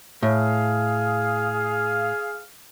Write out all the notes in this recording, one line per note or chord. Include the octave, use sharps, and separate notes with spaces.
A2 G#4 F5